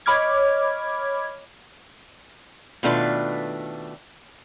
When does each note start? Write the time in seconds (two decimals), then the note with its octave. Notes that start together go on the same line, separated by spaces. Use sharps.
0.06 C#5 D#5 B5 D6 F6 G#6
2.83 B2 D#3 A3 D4 F4 B4